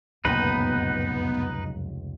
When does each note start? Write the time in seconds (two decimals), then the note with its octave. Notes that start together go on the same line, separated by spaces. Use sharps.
0.25 F1 C#2 F#2 A#2 B3 D#4 B4